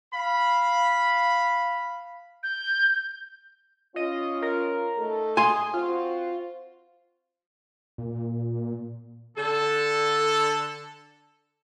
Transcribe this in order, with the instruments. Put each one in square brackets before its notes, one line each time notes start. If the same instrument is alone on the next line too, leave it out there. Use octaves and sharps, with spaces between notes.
[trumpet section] F5 B5
[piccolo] G6
[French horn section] C#4 F4 [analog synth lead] D#5
[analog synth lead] A#4
[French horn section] A3 D#4 A4
[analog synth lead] G#4 [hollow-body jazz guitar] G#5 C6
[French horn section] C4 F#4 C5 [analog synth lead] F4
[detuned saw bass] A#2
[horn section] D3 A4